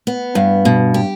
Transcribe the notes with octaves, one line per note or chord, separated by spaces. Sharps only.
B3
G2
B2
G4